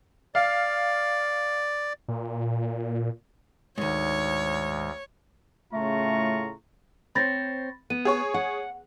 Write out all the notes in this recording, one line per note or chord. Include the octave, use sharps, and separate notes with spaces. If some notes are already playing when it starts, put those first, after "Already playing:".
D5 F5
A#2
D2 G#2 D#3 C#5
A2 C#3 A3 F4 A#5 C#6
C4 C5 C#5 B5 A6 A#6
B3 D#7
G#4 C#5 C#6
F#5